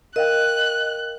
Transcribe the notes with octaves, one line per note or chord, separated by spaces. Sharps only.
A#4 D#5 F5 G5 F#6